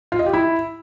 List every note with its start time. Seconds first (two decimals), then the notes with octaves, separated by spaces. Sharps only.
0.12 F4
0.19 D#5
0.26 G4
0.33 E4